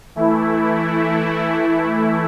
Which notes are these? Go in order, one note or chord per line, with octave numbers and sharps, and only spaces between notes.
E3 A3 E4